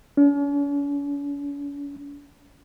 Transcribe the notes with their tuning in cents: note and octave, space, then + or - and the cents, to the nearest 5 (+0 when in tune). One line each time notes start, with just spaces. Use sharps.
C#4 +45